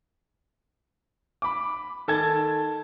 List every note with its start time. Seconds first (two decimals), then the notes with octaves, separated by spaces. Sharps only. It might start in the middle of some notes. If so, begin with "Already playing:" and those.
1.42 B5 D6
2.08 D#3 A4 A5 G#6